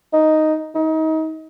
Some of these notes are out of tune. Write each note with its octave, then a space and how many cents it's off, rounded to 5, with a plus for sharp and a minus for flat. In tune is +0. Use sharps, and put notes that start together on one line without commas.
D#4 +0
D#4 +30